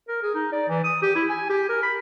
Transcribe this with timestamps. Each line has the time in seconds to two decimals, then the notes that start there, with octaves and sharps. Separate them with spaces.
0.08 A#4
0.22 G#4
0.35 D#4
0.52 D5
0.69 E3
0.84 D#6
1.02 G4
1.15 E4
1.29 G#5
1.49 G4
1.69 A#4
1.83 B5